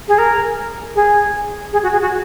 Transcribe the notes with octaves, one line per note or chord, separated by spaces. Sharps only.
G#4
A#4
G#4
G#4
F#4
G#4
F#4